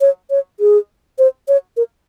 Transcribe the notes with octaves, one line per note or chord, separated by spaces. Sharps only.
C#5
C#5
G#4
C5
C#5
A#4